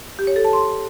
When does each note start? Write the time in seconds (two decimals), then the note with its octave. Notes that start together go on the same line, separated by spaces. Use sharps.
0.19 G4
0.27 C#5
0.36 A4
0.45 A5
0.53 C6